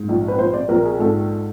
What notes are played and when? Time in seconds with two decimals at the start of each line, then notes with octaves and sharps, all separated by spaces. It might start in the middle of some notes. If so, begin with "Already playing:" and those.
Already playing: G#2
0.09 A#1
0.28 B4
0.38 A#1 C5
0.54 D5
0.69 A#1 A#4
0.85 G#4
0.99 G#2 A4